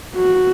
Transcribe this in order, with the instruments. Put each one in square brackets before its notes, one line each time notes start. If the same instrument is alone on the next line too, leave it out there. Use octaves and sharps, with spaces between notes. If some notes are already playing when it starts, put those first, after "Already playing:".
[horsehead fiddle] F#4